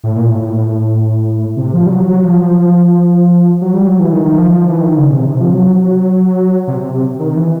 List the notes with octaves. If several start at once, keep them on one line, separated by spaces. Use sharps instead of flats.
A2
A#2
A2
A2
C3
F3
G3
F#3
F#3
F3
F3
F3
F#3
G3
F#3
E3
D#3
D#3
F3
F3
E3
D#3
C#3
B2
C3
C3
F3
F#3
C3
C3
C3
D#3
E3